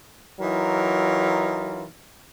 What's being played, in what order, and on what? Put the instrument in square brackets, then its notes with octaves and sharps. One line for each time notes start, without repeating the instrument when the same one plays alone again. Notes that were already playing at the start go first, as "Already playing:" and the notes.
[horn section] E3 F#3 D#4 F4 A#4